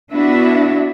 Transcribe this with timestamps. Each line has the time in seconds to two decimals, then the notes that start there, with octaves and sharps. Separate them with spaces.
0.12 B3 D4 E4 F#4 E5